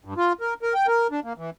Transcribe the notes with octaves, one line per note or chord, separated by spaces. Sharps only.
G2
F4
A#4
A#4
G5
A#4
D4
A#3
E3